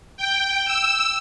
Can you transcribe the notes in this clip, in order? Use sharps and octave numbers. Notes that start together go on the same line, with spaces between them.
G5
E6